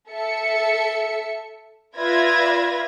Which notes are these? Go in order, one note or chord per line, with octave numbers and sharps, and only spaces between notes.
A4 E5 C#7
F4 B4 D5 E5 G#6 A#6